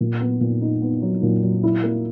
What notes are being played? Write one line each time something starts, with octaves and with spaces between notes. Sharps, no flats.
A#2
B3
A#2
D#4
B3
F#3
A#2
F#3
E4
A#3